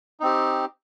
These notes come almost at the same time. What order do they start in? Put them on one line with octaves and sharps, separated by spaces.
D#4 C4 G4